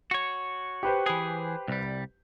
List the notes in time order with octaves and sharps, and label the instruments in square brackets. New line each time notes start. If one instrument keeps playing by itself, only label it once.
[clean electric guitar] F#4 C#5
[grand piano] G4 B4 C5
[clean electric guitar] E3 G#4
C2 G3